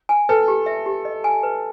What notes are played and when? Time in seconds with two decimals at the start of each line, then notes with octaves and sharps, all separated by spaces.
0.09 G#5
0.29 A4 B4
0.48 G4
0.66 E5
0.86 G4
1.05 D#5
1.24 G#5
1.43 B4